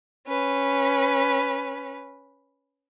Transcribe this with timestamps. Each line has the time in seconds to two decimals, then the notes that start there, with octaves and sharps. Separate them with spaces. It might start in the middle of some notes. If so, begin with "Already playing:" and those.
0.27 C#4 B4